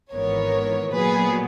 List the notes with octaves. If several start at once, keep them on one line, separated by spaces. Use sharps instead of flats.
G#1 G#2 E3 B3 A#4 C#5
A#2 F#3 B3 G#4 B4